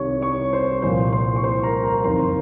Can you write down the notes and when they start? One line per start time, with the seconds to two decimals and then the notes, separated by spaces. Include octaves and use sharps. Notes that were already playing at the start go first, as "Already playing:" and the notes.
Already playing: C2 C3 D#3 C#5 C#6
0.21 C#5 C#6
0.53 C5 C6
0.82 C2 A#2 F3 C5 C6
1.13 C5 C6
1.36 C#6
1.43 C5 C6
1.63 A#4 A#5
1.84 A#4 A#5
2.04 F#1 F2 D#3 C5 C6